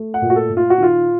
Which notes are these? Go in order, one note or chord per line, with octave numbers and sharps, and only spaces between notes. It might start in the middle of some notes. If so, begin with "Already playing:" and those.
Already playing: A3
F#5
A#2
F#4
A4
A#2
F4
F#4
D#3 F4